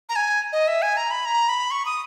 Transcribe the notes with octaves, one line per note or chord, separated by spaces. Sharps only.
A#5
G#5
D#5
E5
G#5
A#5
B5
A#5
B5
C#6
D#6